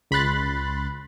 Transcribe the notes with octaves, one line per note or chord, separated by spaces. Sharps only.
C#2 B5 C6 F#6 A6